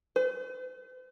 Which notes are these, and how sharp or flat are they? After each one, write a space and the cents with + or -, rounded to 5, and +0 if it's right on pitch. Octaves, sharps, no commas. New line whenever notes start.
C5 -45